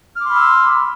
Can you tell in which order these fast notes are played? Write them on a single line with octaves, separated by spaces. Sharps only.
F6 D6 C6 B5 E6